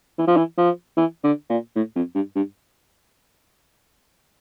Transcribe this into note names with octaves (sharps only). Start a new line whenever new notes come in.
E3
F3
E3
F3
E3
D3
A#2
A2
F2
G2
G2